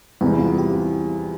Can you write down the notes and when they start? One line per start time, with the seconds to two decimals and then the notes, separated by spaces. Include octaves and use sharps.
0.21 E2 C3 G3 C4 E4
0.40 F4
0.58 G4